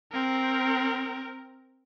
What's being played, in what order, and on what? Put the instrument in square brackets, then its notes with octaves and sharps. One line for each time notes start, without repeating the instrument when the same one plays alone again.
[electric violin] C4 A#4